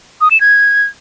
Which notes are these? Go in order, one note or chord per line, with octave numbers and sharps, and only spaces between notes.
D#6
E7
G#6